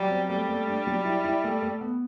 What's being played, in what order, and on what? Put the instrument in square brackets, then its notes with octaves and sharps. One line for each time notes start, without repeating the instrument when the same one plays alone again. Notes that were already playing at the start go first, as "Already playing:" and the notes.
Already playing: [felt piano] F#3 [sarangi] G3
[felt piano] C4
[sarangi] G3 [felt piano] A3
[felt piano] A3
G2
F#3
E4
E4
A3
A3
B3